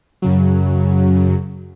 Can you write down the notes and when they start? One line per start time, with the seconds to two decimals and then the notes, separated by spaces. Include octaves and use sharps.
0.22 F#2 C#3 F#3